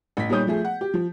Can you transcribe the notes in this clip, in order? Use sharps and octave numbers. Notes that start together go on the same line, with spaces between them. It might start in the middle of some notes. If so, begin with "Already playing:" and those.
A1 B6
A#2 G3 D#4 C#5 D#6 G6
F3 A3 G#4
F#5
G4
F3